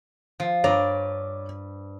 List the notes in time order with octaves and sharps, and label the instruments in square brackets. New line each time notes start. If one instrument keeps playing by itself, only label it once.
[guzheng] F3
[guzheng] G2 D5 A#5 [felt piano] C#5